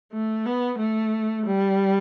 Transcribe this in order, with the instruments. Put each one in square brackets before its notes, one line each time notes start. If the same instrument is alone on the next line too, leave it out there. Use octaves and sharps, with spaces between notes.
[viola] A3
B3
A3
G3